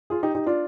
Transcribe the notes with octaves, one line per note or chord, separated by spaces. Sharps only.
F4 G#4
D#4 G4
D#4 G4
D4 F4